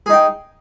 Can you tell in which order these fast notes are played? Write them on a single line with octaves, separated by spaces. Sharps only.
G#4 D#4 G5